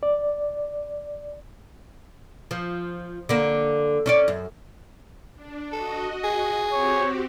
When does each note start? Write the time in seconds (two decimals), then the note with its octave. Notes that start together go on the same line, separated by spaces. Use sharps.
0.03 D5
2.51 F3
3.29 D3 A#3
4.06 C#4 C#5 D5
4.28 F#2
5.35 D4
5.72 F#4 A4 D#5
6.24 G#4
6.72 C4 F#4 G4 C#5